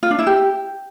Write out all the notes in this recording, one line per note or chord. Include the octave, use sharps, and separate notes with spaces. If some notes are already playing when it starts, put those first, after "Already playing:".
F4
D4
E4
G4